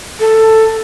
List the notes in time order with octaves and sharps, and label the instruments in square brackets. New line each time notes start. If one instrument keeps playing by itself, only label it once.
[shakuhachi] A4